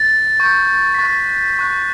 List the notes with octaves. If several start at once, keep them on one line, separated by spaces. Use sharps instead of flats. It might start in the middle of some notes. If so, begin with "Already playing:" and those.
Already playing: A6
C#6 G6
B6
C#6 F#6 A6
C#6 F#6